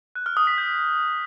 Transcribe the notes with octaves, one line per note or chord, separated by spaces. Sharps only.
F#6
F6
D#6
B6
G6